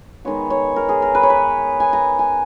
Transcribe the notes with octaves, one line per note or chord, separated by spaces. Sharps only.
D#3 G#3 B3 C#5
C#5
A#4
G#4
A#4
B4
C#5
B4
G#5
A#5
G#5